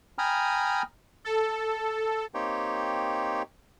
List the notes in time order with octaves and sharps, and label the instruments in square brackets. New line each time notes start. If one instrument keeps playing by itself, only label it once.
[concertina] G5 G#5 A#5 B5 D#6 F6
[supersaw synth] A4
[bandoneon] A#3 C4 D#4 G4 C#5 G5